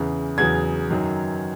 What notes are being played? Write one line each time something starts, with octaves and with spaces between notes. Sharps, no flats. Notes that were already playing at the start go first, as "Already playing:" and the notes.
Already playing: E2 C#3 E3
E2 C#3 F#3 G#6
F#2 D#3 F#3